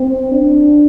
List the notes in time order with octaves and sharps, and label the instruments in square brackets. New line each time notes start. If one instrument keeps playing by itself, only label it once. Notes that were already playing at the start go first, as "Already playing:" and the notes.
Already playing: [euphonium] C4
D4